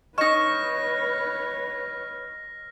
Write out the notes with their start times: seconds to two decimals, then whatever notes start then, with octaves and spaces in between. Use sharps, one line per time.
0.18 D#4 B4 C#5 D#5 C#6 F6 A#6 E7